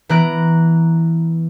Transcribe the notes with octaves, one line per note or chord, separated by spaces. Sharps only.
E3 B3 A#5 F#6 D7